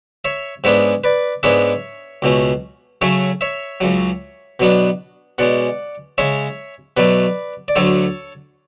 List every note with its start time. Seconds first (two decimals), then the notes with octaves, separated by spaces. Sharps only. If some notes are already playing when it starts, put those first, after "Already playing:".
0.25 C#5 E5
0.64 G#2 G#3 B3 D4 C#5 E5
1.04 B4 D5
1.43 G#2 G#3 B3 D4 C#5 E5
2.22 C#2 B2 A3 C#4
3.01 C#3 F#3 A3 C#4 C#5 E5
3.41 C#5 E5
3.81 C#2 C#3 F#3
4.60 B2 F#3 B3 D4
5.38 B2 G#3 C#4 D5 F#5
6.18 C#3 G#3 C#4 C#5 E5
6.97 B2 F#3 A3 B4 D5
7.68 D5
7.76 D2 D3 F#3 A3 A4 C#5